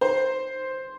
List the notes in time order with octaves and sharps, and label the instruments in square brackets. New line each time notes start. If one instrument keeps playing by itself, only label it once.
[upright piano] C5